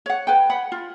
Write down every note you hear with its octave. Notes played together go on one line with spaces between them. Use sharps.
C#5 F#5
B4 G5
F#5 B5
F4